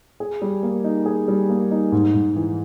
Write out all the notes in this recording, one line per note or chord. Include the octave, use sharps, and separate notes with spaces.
G#4
G3
A#3
D#4
G#4
G3
A#3
D#4
G#2
G#2
E3